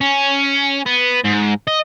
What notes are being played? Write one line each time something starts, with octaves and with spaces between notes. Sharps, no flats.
C#4
B3
G#2
D#5